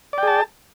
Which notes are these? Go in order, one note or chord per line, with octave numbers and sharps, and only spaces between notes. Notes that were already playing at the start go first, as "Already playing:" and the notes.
G#4 D5 G5 A5